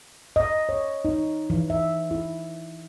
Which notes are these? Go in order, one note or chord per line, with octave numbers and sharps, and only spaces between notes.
D#5
C#5
D#4
E3
E5
E4